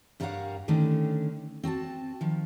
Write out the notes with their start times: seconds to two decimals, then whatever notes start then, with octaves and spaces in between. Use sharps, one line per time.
0.20 G2 G3 A#4 C#5 F5 F#5
0.68 D3 D#3 A3 C#4 D4
1.63 C4 F#4 G#5 A5
2.21 D#3 F3